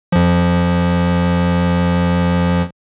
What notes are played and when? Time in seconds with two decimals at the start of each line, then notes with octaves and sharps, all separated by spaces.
0.12 F2 F3